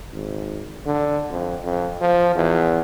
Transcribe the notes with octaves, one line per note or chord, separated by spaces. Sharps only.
G#1
D3
F2
F2
F3
E2